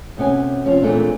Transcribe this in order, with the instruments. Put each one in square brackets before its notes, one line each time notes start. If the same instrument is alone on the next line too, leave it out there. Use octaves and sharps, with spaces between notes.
[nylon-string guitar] D2 C3 B3 C#4 G#5
C3 F3 C#4
A#2 E3 G#3 A3 C4 D4